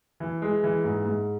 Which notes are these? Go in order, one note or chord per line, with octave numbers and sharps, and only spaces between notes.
E3
G#3
E3
G#2
G#2